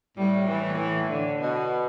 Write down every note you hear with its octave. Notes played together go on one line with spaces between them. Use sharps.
A2 G3
E3
E3
D3
B2